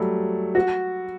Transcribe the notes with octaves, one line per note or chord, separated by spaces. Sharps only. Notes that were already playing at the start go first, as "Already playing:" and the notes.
Already playing: F#3 G3 A3
F#4